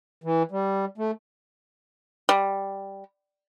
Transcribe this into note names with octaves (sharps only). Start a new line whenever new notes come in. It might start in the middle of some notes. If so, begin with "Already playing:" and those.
E3
G3
A3
G3